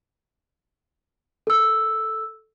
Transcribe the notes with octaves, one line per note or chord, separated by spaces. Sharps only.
A4 E6